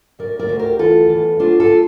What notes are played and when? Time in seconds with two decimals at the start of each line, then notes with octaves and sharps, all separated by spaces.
0.19 D2 A#4 D5
0.39 A#4 D5
0.49 D2
0.59 G4 A#4
0.79 E3 F4 A4
1.10 E2
1.40 D2 D4 F4
1.60 F4 A4